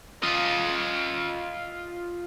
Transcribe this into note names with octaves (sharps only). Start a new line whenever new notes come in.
F4 D#5